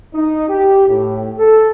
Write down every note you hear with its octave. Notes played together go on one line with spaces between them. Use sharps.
D#4
G4
A2
A4